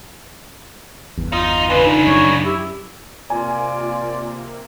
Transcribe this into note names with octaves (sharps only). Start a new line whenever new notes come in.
G1 E2
D#4 F4 D#5
C#3 D4 B4
D#4
F#2 C#5
E4 G4
C3 A#3 F4 D5 G#5